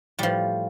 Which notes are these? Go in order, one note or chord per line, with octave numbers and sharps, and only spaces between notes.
A2 F3 G3